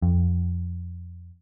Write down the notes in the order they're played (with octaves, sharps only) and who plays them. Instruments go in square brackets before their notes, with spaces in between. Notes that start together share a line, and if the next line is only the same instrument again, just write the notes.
[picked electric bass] F2